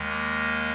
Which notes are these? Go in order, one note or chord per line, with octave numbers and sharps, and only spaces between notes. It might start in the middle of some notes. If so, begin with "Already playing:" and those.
Already playing: D#2 D#3 G#3
A#3